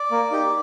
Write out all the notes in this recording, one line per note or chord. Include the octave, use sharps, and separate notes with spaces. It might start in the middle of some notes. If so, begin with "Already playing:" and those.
Already playing: D5
A#3
D#4 G4